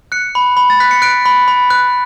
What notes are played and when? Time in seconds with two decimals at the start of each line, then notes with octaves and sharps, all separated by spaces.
0.12 F#6 C#7
0.35 B5
0.57 B5
0.70 A6
0.80 F#6 B6
0.91 C#7
1.02 F#6 D7
1.26 B5
1.48 B5
1.70 F#6